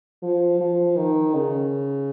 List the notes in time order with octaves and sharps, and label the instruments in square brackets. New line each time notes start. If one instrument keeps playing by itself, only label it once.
[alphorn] F3
F3
D#3
C#3